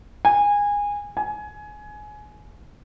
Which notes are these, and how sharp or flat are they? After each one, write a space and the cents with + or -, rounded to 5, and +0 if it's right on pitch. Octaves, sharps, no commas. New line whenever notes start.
G#5 -20
G#5 +20